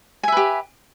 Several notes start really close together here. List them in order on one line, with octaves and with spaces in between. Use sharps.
G#5 E5 B4 G4